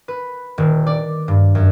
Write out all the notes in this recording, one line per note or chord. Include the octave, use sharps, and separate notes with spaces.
B4
D#1
D5
G2
F#2